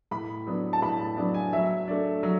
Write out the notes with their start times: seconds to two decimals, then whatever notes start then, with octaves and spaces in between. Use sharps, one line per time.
0.11 A2 B5
0.47 F#3 B3 D4
0.73 A5
0.82 A2 B5
0.99 A5
1.17 F#3 B3 D4
1.34 G#5
1.53 F#3 E5
1.88 A3 D4
2.23 F#3